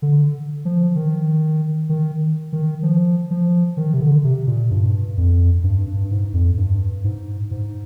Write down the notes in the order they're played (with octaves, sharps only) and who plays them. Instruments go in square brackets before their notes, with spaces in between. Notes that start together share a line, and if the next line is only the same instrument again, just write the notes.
[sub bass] D3
F3
D#3
D#3
D#3
F3
F3
D#3
C3
D3
C3
A#2
G2
F2
G2
G2
G#2
F2
G2
G#2
G#2